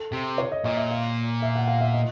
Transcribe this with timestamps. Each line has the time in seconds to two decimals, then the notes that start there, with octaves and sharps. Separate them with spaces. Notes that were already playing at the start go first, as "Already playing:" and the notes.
Already playing: A4
0.12 C3
0.38 C#5
0.52 D#5
0.64 A#2 D#5
0.77 E5
0.91 F5
1.42 E5
1.56 F#5
1.68 F5
1.81 E5
1.94 D#5